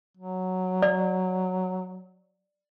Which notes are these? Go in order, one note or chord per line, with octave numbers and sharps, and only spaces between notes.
F#3
D5